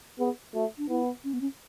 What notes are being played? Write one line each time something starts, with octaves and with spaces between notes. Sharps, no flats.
B3 G#4
A3 F#4
D4
B3 E4
C#4
B3
C#4